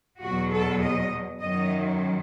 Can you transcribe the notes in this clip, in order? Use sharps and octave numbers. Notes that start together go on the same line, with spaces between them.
E2 B2 F#3 F#4
A4
D#5
F#2 D#3 F#3 D#5